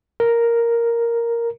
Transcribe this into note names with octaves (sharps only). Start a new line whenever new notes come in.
A#4